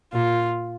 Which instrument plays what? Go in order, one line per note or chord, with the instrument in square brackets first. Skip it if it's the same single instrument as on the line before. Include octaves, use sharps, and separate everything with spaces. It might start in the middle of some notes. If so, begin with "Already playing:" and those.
[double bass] A#2 [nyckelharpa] F4